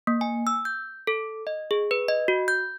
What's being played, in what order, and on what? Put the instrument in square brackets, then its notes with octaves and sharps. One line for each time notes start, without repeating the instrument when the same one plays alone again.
[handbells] A#3
G#5
E6
G6
A4
D#5
G#4
B4
D#5
F#4
G6